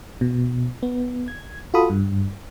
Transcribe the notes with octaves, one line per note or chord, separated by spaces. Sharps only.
B2
B3
G#6
F4 F#4 A4 B5 D#6
G2